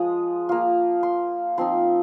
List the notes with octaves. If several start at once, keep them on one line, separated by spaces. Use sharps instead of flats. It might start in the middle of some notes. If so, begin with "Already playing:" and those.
Already playing: F3 G#3 D#6
A#3 F4
C6
F3 C4 D#4 C6